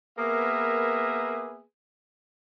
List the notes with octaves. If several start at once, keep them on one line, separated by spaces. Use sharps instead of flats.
A#3 B3 G#4 A#4 B4 E5